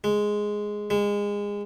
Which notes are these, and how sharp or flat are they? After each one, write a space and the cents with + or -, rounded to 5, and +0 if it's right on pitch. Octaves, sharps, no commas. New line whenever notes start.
G#3 +0
G#3 -25